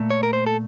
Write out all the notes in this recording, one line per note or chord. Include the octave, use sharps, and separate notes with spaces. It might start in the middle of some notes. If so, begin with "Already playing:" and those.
Already playing: A#2 A3
C#5
A#4
C5
A4